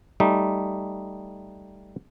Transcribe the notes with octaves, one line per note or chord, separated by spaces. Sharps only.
G3 A3 D#4